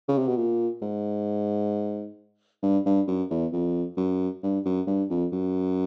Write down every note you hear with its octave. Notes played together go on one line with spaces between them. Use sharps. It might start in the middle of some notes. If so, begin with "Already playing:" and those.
C#3
C3
B2
A#2
G#2
G2
G2
F#2
E2
F2
F#2
G2
F#2
G2
F2
F#2